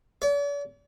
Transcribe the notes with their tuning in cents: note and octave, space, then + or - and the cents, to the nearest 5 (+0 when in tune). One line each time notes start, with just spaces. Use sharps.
D5 -45